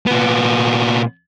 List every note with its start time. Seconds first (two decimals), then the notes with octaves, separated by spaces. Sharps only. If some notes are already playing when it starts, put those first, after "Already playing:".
0.07 A#2 B3